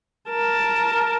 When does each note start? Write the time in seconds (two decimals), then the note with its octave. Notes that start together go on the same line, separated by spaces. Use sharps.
0.30 A#4 A5